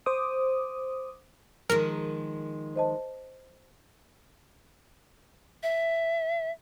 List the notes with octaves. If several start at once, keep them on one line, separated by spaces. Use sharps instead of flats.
C5 D6 D#6
D#3 F3 G#3 A#4
C5 D#5 A5
E5